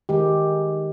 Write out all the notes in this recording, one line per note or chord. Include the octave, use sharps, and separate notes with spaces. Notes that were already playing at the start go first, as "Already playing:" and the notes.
D#3 G#3 G4